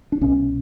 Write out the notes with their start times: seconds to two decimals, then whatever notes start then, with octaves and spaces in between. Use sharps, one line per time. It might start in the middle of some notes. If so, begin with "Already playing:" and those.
0.12 D4
0.21 C2 B2 C#4